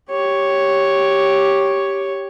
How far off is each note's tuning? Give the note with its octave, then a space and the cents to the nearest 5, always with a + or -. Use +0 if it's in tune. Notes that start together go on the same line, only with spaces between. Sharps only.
G4 +0 C#5 +0